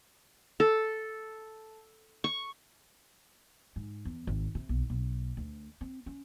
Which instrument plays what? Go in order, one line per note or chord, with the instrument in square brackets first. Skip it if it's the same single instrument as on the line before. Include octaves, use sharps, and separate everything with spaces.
[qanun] A4
C#6
[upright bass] G#2
E2
G#1
C3
B1
B1
D2
C4
C#4